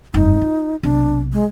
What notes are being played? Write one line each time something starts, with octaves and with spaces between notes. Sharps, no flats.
F1 G2 D#4
F4
B1 C3 D4
G#3